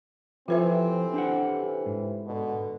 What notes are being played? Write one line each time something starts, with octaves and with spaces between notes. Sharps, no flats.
A2 C3 E3 F3 C4 F4 B4 E5
D4 G4 F#5
G#2
B2 D3